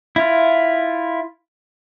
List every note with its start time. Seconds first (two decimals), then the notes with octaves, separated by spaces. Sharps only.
0.16 E4 F4